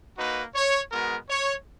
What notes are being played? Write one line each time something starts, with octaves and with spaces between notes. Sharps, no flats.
A#3 D#4 F#4 B4
C#5
G#3 B3 F#4 A#4
C#5